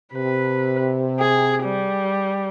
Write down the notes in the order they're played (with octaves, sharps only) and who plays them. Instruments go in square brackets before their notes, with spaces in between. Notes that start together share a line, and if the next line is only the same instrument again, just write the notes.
[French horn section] C3 [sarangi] B4
[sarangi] G#4
G3